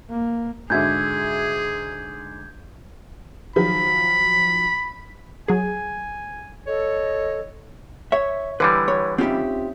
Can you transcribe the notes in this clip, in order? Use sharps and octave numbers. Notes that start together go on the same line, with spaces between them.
A#3
G#2 D3 F#4 G#4 E5 G6 G#6
D#3 F3 F#3 B5
F#3 G#4 G#5
A4 C#5 D#5
C#5 E5
D3 E3 G3 B4
C#5
C4 C#4 D#4 F4 G4 E5